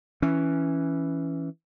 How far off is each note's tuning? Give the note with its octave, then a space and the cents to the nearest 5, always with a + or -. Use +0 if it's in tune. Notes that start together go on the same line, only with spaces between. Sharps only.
E3 +0 C#4 +0